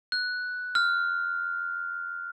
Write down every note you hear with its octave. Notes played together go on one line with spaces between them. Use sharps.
F#6
F6